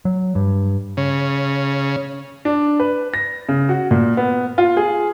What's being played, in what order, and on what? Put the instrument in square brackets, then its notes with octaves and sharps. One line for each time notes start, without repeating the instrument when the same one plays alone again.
[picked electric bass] F#3
G2
[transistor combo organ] C#3
[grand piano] D4
B4
A#6
C#3
F#4
A#2
B3
F4
G#4